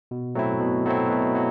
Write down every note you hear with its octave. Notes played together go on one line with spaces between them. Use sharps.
B2
F#3 A3 C4 E4
B2
F#3 A3 C4 E4
B2
F#3